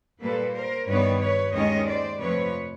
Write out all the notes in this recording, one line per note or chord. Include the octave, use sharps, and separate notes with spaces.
A#2 G3 A#3 A4 B4
A#4 C5
G2 D#3 G3 B3 B4 C#5
B4 C#5
D#2 D#3 G#3 C#4 C#5 D#5
C5 D5
F2 C3 F3 A3 B4 C#5